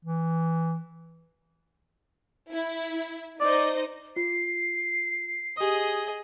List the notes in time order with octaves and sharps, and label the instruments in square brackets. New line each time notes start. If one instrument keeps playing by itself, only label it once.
[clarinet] E3
[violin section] E4
[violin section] D#4 C5 D#5 [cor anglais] D5
[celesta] F4 [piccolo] C7
[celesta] G4 D#6 [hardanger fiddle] G#4 D#5